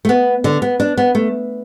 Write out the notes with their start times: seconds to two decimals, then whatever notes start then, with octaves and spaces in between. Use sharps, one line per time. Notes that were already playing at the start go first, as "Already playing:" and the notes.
0.05 A3
0.09 B3
0.44 D3
0.62 B3
0.80 D4
0.98 B3
1.15 A3